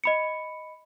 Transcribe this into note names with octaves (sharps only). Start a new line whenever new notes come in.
D#5 B5 C#7